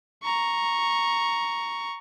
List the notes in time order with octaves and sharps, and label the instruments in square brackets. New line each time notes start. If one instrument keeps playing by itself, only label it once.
[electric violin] A#5 C#6